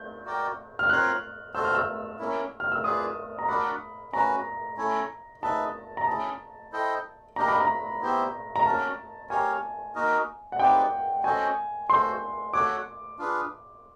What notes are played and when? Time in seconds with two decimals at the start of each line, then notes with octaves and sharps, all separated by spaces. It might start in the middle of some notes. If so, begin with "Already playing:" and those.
Already playing: G6
0.25 F#4 A#4 D5 G5
0.79 F6
0.89 C4 F4 A#4 C#5 F5 F#6
1.54 F#4 A4 C5 E6
1.65 F6
1.75 E6
2.19 A#3 C#4 E4
2.60 F6
2.72 E6
2.84 F4 G#4 B4 D5 D#6
3.39 A#5
3.48 D4 F#4 A#4 D5 F#5 B5
4.13 C#4 F#4 B4 A#5
4.77 A3 C#4 E4 A4 C#5
5.42 D#4 G#4 B4 E5 A5
5.97 A#5
6.07 C#4 E4 G#4 A5
6.72 E4 A4 C5 D#5 G5
7.36 A#3 D4 G4 A#4 D#5 A#5
7.48 B5
7.60 A#5
8.01 B3 E4 G4 C5 E5
8.56 A#5
8.66 A#3 C#4 F#4 A#4 A5
9.30 G4 A#4 C#5 F5 G#5
9.95 A#3 D#4 F#4 A#4 D#5
10.52 F#5
10.59 C4 D#4 G4 B4 D5 G5
11.24 C#4 F#4 A4 C5 D#5 G#5
11.89 F#4 A4 C5 C6
12.54 F#4 A4 C#5 F#5 D6
13.19 D4 F4 G#4 B4